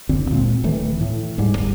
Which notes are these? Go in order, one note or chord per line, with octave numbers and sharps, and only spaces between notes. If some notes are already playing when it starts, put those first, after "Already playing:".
F#1 D2 D3 C4
A#2 G#3 C4
D1 D#3 E3 A3
A2
D1 G#2 G3
G1 G3